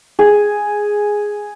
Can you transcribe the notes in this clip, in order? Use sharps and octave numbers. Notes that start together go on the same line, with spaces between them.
G#4